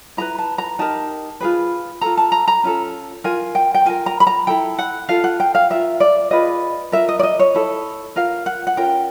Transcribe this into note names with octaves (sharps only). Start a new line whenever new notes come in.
E4 G#4 B4 A#5
A5
A#5
D#4 G4 A#4 A5
F4 G#4 B4
F4 A4 A#5
A5
A#5
A#5
C#4 F4 A4
F4 A#4 G#5
G5
G5
F4 A#4 G#5
A#5
B5
A#5
E4 A4 G5
F#5
F4 A4 F5
F#5
G5
F5
F4 A#4 E5
D5
F4 G#4 B4 D#5
F4 A#4 E5
D#5
D5
D#5
C#5
E4 A4
F4 A#4 F5
F#5
F#5
C#4 F4 A#4 G5